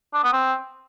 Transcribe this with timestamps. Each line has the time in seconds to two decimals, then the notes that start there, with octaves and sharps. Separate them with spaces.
0.14 D4
0.23 B3
0.33 C4